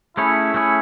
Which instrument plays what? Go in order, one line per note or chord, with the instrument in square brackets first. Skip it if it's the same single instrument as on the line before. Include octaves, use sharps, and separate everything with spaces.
[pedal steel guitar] A3 C#4 G#4 C#5 [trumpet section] E4
[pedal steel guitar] A3 C#4 G#4 C#5